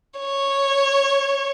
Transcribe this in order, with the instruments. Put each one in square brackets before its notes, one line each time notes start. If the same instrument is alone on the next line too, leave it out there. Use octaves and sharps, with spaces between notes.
[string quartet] C#5